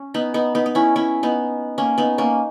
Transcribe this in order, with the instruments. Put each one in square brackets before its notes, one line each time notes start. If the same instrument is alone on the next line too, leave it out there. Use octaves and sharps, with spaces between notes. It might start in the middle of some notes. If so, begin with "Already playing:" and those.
Already playing: [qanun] C#4
B3 D#4
B3 D#4
B3 D#4
D#4
C#4 E4
C#4 E4
B3 D#4
A#3 C#4
B3 D#4
A#3 C#4